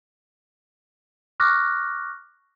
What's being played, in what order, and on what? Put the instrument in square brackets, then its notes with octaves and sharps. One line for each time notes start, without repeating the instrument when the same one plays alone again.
[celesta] C#6 D6 F6 F#6 A#6